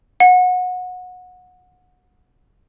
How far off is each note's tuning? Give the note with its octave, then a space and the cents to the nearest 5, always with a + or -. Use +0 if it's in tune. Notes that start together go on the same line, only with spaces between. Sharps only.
F#5 -25